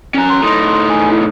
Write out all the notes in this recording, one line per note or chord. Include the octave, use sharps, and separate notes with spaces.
C#4 G#5 A#5
C6
A2 D#4
G#5
E4